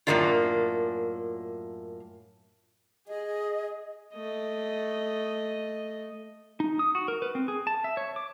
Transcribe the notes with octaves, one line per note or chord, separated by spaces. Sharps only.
F#2 A2 G#3 A#3 D4 F4
G#4 D#5
A3 D#5
D#4
D#6
F#4
A#4
B4
C4
G#4
A5
E5
C#5
D6